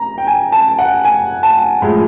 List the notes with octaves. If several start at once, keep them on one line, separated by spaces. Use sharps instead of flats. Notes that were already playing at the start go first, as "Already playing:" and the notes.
Already playing: A#5
G5
G#5
A5
F#5
G#5
A5
A2 F3 G#3